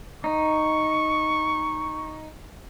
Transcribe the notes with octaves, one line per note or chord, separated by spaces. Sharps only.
D#4 C#6